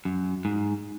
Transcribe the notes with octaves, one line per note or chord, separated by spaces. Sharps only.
F#2
G#2